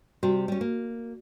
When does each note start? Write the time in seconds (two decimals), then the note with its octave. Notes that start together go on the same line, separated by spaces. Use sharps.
0.23 C3 G3 F#4
0.48 G3 C#4
0.61 A#3